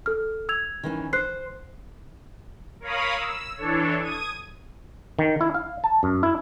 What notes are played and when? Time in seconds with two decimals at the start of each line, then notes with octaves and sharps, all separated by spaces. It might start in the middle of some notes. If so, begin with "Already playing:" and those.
0.06 A4 F6
0.49 E6 G#6 F7
0.83 D#3 E3 C#4
1.13 C5 F#6 C7
2.80 A#4 C#5 F5 B5 D#6
3.16 E6
3.57 E3 D4 A4 C#5
4.02 D#6 G#6 D#7
5.19 D#3
5.41 E4
5.54 F5
5.84 A5
6.03 F#2
6.23 E4